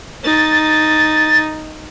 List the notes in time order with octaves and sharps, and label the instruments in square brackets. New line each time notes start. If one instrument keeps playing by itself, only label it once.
[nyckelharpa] D#4 [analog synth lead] A6